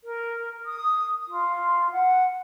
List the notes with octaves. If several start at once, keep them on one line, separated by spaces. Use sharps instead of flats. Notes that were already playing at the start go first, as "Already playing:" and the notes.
A#4
D#6
F4
F#5